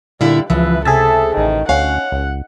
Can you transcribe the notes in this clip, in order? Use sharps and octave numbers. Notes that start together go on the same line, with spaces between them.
A#2 D3 G3 E4 E5 F5
C#2 E3 F3 B4 E5
C3 G#4 A4 E5 A5
A1 D#3
D2 C#4 F5 F#5
C#2